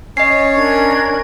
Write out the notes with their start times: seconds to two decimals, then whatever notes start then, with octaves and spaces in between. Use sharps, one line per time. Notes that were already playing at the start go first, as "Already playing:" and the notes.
0.17 C#4 C#5 D#5 C7
0.54 D4 A#4 G#6